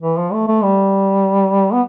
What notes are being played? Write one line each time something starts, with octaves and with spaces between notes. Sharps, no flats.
E3
F3
A3
A3
G3
B3